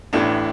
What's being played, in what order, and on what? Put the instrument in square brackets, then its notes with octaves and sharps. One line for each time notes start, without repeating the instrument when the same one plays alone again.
[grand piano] A1 A2 E3 D4